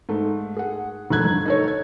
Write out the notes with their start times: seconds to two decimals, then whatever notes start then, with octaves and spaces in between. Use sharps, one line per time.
0.09 G#2 A3
0.57 G#4 F#5
1.10 E1 F2 A3 F#6 G#6
1.25 G1
1.46 D#4 A4 C#5
1.68 G#6